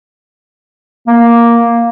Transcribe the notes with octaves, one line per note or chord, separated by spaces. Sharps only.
A#3